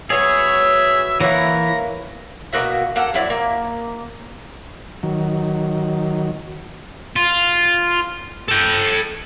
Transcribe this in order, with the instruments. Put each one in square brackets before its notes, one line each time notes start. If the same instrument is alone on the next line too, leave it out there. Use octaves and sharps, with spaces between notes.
[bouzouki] F#3 B3 [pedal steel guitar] G#4 C#5 [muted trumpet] E5
[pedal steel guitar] E3 E4 [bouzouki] A#3 C#5 F#5 [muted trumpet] A#5
[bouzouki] B2 A#3 F#4 E5
A#3 A4 F#5
F#3 E4 D5
A#3
[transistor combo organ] D#3 F#3
[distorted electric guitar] F4
A4 G5